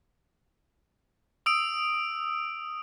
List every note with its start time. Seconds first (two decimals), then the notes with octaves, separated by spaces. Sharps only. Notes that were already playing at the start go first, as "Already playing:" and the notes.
1.46 D#6 E6 D7